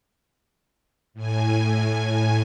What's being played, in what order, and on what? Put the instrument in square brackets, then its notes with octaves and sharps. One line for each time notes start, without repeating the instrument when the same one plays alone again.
[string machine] A2 G#5